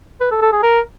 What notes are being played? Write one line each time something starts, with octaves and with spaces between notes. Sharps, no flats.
B4
A4
A4
G#4
A#4